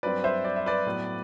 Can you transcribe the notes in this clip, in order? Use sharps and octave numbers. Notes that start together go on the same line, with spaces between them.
G2 F#3 C4 B4 D5
C5 E5
D5
E5
B4 D5
A2 F#3 B3